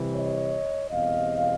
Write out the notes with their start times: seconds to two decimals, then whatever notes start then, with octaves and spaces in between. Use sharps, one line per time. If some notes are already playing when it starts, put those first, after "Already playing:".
Already playing: C3 E3 G3
0.16 C#5 D#5
0.91 E2 B2 G3 C4 D#5 F5